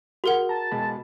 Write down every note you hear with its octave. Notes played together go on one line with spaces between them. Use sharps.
F#4 G#4 A#4 F#5
A5 A#5
B2 G#3 B5